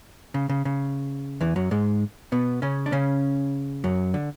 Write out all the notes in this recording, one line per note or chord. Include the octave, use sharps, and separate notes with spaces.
C#3
C#3
C#3
E2 E3
F#2 F#3
G#2 G#3
B2 B3
C#3 C#4
D4
C#3 C#4
F#2 F#3
D3